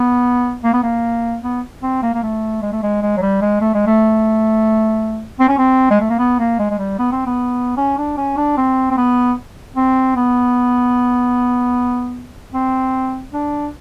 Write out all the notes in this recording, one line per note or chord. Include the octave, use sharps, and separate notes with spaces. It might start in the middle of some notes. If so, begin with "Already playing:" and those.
Already playing: B3
A#3
B3
A#3
B3
C4
A#3
A#3
A3
G#3
A3
G#3
G#3
F#3
G3
G#3
A3
G#3
A3
C4
C#4
C4
G#3
A3
A#3
B3
A#3
G#3
G#3
G3
B3
C4
B3
C#4
D4
C#4
D4
C4
C4
B3
C4
B3
C4
D4